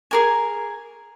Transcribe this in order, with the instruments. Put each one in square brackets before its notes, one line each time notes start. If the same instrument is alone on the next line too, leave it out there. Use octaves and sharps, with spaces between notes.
[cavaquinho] G#4 A#4 G#5